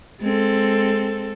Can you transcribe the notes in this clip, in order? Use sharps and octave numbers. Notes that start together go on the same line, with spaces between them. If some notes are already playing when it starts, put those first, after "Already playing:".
G#3 C4 A4